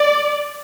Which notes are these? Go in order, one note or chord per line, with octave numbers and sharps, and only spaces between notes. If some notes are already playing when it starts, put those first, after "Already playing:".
Already playing: D5